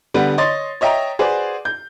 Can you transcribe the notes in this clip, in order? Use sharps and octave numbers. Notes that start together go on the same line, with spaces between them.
D3 G3 B3 B4
C#5 D#5 C6 A6
C#5 D#5 E5 G5 A#5
F#4 G#4 B4 C5 D5
G6